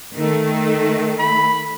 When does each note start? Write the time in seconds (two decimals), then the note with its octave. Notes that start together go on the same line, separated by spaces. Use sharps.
0.14 D#3 A3
1.19 B5